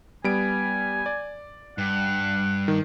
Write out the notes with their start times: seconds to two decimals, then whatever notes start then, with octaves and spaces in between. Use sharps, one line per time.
0.24 G3 B3 G#5 D7
1.06 D5
1.78 G2 F#5
2.68 D#3